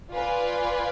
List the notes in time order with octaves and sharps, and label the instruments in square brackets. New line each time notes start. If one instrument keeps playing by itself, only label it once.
[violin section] F4 B4 D5 G#5